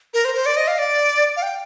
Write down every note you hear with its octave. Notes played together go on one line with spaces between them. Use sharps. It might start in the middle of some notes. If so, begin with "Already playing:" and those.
A#4
C5
C5
D5
D#5
F5
D5
F5
G5